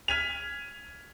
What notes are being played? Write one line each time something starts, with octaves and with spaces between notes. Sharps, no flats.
F6 G#6 B6 D#7 F7